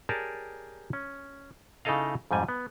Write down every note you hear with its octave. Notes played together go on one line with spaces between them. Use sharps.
G4 G#4 A#4 C#5 D5 A5
C#4
C#3 D#4 E4 A4 D#5 F5
F2 G#2 G3 G#5
B3